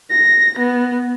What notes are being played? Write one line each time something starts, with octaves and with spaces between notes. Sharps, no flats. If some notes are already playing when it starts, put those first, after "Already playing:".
A#6
B3